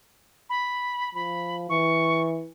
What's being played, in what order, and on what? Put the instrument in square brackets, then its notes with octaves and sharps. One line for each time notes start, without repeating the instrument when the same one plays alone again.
[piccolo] B5
[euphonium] F3 [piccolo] B5
[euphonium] E3 [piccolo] C#6